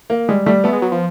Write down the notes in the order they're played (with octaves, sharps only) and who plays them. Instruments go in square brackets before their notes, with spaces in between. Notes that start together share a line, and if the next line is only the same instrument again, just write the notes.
[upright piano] A#3
[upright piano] G3 [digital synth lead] G#3
[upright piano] G3 [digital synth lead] A3
[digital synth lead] A3 [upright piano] B3
[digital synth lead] G#3
F#3
F3